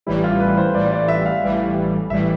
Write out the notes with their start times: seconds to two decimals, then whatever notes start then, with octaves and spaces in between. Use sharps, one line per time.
0.06 A1 A2 E3 G3 E4
0.24 F4
0.40 B4
0.57 C5
0.74 A1 A2 E3 G3 D5
0.92 D5
1.08 E5
1.26 F5
1.43 A1 A2 E3 G3
2.10 A1 A2 E3 G3 E5